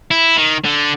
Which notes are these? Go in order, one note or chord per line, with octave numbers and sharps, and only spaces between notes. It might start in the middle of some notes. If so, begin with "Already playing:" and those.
E4
D#3
D3